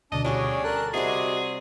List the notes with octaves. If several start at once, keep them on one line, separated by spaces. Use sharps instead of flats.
D2 B2 D3 D4 D#5 A5
G3 C#4 D4 F#4 G#4 C#5
A4 A#4 D5 A5 F#6
C3 G3 F#4 G#4 D#5 C6 C7